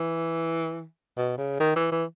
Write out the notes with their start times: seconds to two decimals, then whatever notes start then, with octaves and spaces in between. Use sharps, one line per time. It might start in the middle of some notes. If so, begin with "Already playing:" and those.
Already playing: E3
1.17 B2
1.38 C#3
1.60 D#3
1.76 E3
1.92 E3